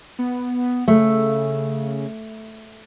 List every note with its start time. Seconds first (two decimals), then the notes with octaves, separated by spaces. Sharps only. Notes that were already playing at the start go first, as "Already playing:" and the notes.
0.19 B3
0.88 C#3 A3